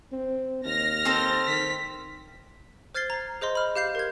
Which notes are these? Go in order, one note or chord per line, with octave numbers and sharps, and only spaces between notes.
C4
D#2 F6 A#6
C4 A4 C5
D#3 B6
C5 F6 G#6 A6 C7 G7
A#5
G#4 C5 D#5 C6
B5 F6
G4 F5 G6 C7
A#4 G#6